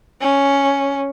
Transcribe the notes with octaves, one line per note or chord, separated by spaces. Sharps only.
C#4